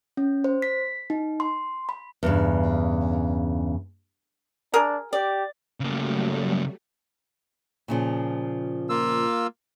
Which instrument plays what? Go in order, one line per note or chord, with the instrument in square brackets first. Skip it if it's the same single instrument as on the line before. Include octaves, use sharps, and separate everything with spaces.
[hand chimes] C#4
C5
B6
D#4
C6
B5
[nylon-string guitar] E2 G2 C#3
[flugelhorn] D4 [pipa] G#4 A#4
[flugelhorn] G4 [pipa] D5
[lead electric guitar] C#3 A#3 [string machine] F#3 G3 A3
[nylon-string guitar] A#2 C#3 F3
[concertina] A#3 F4 E6